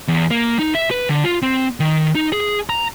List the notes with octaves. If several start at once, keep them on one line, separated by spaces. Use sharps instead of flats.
E2
A#3
D#4
E5
B4
D3
F4
C4
D#3
D#4
G#4
A#5